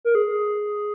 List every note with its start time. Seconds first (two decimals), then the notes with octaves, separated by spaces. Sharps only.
0.05 A#4
0.15 G#4